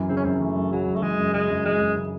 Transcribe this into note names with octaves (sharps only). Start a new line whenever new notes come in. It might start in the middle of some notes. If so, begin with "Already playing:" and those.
Already playing: F#2 E3
C#3 C4
C#4
F#2 C4
E3 A3
F#2
C#3 F#3
F#2
A3
E3 G#3
F#2
C#3 G#3
F#2
E3 G#3
F#2
C#3